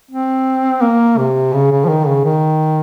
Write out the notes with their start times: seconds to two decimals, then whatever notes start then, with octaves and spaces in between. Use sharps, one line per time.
0.11 C4
0.82 A#3
1.18 C3
1.53 C#3
1.72 C#3
1.85 F3
1.89 D#3
2.07 C#3
2.24 D#3